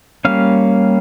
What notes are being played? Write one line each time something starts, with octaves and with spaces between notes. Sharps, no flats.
G3 A#3 C#4 F5